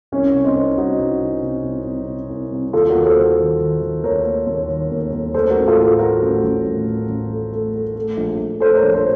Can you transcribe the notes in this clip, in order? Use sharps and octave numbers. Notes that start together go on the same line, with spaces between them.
C2 C#4
C3
C4 D#4
C2
C2 D#4 F#4
C2
C3
C3
C2
C3
C3
C2
C3
D#2 F4 A4
F#4 A#4
D#2
A4 C5
D#2
D#3
D#3
D#3
D#2 A#4 C#5
A#3
D#2
D#3
D#2
D#2
A3 A4 C5
F#4 A#4
A1
F4 A4
A2
F4 A4
A3 F#4 A#4
A1
A1
A1
A1
A1
A3
A3
A3
A3
A#1
A#1
A3 A4 C5
A#4 C#5
A#1
A4 C5